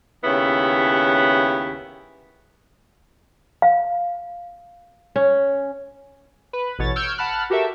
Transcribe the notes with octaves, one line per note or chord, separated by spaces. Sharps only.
D#2 C#3 B3 E4 G4 C#5
F5
C#4
B4
A1 B2 C#5 A6
C#6 E6 F6 G6 G#6 D7
F#5 A5 B5 F6 F#6
F#4 G4 A4 A#4 E5